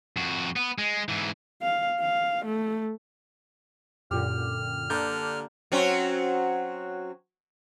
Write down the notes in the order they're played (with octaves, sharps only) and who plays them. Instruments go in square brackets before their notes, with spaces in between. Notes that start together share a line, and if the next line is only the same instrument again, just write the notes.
[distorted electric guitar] F2 F#4
B3
G#3
G#2 E3
[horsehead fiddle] F5
F5
A3
[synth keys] F#2 A#2 D3 [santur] G4 [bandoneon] F6
[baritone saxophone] D3 [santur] A#3 D4 [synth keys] G6
[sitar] F#3 C4 C#4